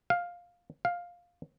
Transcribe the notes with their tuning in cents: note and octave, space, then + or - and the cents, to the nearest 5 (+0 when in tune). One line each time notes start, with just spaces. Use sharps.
F5 +10
F5 +10